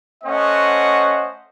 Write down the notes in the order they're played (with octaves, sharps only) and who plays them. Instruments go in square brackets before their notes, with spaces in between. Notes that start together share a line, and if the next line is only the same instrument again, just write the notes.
[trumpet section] A3 C#4 C5 D#5 F#5